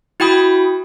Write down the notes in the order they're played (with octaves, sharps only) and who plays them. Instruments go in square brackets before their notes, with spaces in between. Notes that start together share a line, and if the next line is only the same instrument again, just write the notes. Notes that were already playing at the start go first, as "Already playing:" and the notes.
[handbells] E4 F#4 G5 B5 D#6